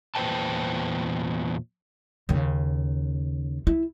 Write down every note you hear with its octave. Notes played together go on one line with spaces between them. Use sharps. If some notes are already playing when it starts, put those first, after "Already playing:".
E2 A#2 B4 C5 G5 A5
D#2 C#3
E4